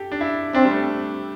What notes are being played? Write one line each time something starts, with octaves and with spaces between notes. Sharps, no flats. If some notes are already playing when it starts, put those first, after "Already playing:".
Already playing: G4 A4
D4
E4
C4 D4
G3
A3